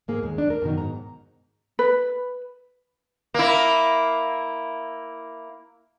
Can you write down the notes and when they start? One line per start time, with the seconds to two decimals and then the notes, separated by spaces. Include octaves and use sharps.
0.08 G#2 A#3 G#4
0.23 D#2 G#3
0.38 D4
0.50 A#4
0.62 F#2 B2 D#3
0.78 G#2 A#5
1.79 B4
3.34 A#3 E4